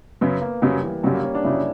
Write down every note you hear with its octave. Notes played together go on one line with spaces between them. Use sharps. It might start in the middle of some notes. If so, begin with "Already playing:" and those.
F#2 C#3 F#3 B3
A#3
F#2 C#3 F#3 G3
E3
F#2 C#3 F#3 G3
A#3
C#4
D4
F#2 C#3 F#3 E4